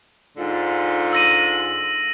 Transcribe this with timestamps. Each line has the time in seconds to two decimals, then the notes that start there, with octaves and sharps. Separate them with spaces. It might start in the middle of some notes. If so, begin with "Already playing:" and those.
0.37 G#2 D3 F4
1.13 E6 A#6 D#7